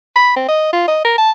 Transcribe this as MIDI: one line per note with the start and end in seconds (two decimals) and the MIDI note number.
0.16 0.36 83
0.36 0.44 60
0.48 0.73 75
0.73 0.88 65
0.88 1.01 75
1.05 1.13 70
1.18 1.31 81